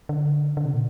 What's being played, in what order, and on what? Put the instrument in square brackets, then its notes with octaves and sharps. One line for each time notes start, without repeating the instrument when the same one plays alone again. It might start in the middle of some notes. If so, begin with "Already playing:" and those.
[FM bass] D3
D3
C3
A#2